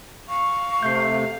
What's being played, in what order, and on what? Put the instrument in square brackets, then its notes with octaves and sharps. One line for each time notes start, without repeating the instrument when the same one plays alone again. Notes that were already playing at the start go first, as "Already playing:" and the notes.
[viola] F5 [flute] C#6
[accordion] C3 A3 [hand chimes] G6 C7